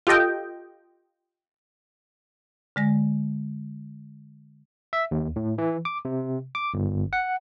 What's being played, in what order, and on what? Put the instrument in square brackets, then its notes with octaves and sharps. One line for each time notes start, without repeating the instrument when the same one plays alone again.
[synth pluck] F4 G4 A4 D#5 G5
[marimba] D3 G#3 A#6
[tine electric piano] E5
D#2
A2
E3
D6
C3
D6
G1
F#5